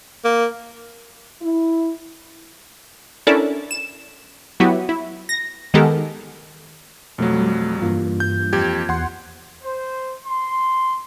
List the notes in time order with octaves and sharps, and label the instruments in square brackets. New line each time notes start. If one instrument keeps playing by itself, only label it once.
[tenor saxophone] A#3
[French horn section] E4
[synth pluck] C#4 D4 E4 A4 A#4 D5
E7
F#3 B3 E4 F#4 G4
E4
A#6
D#3 G#3 B3 G4 A4 A#4
[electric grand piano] F2 F#3 [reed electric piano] B2 A3 [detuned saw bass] G3
[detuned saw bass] G2 [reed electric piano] E3 A#3 F4
[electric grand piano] G6
F2 G4 G#6
[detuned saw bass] E2 [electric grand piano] F#5 C6
[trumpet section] C5
C6